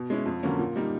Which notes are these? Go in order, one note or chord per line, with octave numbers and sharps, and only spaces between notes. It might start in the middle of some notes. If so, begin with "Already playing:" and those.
Already playing: B2
G#3 C#4 E4
F2
D3 F#3 A#3 C#4
A#2
G3 A#3 D#4